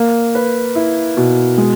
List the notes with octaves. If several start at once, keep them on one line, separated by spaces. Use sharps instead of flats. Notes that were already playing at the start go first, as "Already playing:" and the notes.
Already playing: A#3
B4
E4
B2
G#3